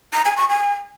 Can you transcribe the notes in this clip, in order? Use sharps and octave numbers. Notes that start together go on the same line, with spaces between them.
A#5
G#5
C#6
G#5